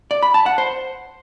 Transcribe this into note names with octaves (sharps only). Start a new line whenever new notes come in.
D5
B5
A5
F#5
C5